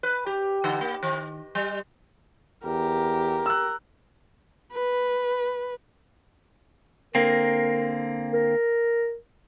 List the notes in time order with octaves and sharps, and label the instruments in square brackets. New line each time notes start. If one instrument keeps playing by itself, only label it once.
[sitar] B4
G4
D3
A#3
D#3
G3
[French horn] E2 [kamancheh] G4 [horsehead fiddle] A#4
[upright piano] E6 F#6
[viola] B4
[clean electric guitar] D3 A#3 C4 [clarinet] A#4
[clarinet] A#4